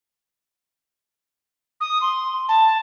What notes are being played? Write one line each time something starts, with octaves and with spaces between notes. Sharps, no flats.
D#6
C6
A5